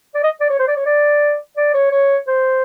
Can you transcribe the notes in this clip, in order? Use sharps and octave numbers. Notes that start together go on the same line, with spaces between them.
D5
D#5
D5
C#5
C5
D5
C#5
D5
D5
C#5
C#5
C5